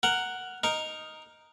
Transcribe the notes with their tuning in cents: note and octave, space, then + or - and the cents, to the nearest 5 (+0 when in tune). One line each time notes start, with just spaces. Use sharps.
A#4 -5 F#5 +0
D#4 +0 A#4 +0